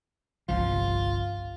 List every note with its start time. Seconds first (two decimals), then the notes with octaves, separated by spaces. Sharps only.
0.49 G1 C2 F3 F4